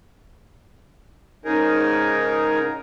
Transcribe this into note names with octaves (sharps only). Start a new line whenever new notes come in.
G#2 C#3 D#4 G#4 A#4